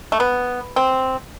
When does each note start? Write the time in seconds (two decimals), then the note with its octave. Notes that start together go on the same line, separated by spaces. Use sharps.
0.12 A3
0.20 B3
0.76 C4